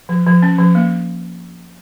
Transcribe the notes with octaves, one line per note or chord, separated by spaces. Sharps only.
F3
F3
C#4
F3
A#3